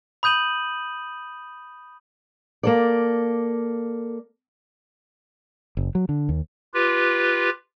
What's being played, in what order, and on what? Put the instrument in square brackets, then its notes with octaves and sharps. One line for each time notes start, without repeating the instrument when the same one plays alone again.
[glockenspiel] B5 D#6 G6 D#7 F#7
[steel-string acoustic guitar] A#3 A4 D5
[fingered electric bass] F#1
F#3
D3
D#2
[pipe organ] F4 G4 B4